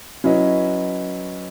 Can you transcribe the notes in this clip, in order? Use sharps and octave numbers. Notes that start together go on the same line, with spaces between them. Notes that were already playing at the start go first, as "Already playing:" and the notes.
F#3 C#4 E4 B4 D#5